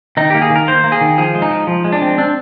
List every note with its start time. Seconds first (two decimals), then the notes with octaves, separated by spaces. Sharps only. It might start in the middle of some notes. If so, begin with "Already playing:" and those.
0.17 D#3 D#4
0.30 A#3 G4
0.42 G#4
0.50 D#3
0.56 A#4
0.67 A#3 C5
0.84 A#3
0.92 G#4
1.01 D#3
1.18 F3 G#4
1.35 G#3
1.42 D#4
1.50 F3
1.67 F3
1.84 G#3
1.92 D4
2.02 C4
2.18 C4 D4